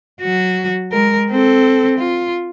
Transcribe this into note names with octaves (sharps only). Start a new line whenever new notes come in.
F#3 F#4
G#3 A#4
C4 A4
F4